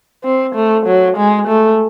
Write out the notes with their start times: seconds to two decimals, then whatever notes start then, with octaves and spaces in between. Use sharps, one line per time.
0.24 C4
0.55 A3
0.86 F#3
1.17 G#3
1.48 A3